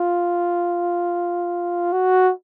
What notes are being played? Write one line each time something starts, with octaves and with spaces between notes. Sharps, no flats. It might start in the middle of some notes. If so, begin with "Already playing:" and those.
Already playing: F4
F#4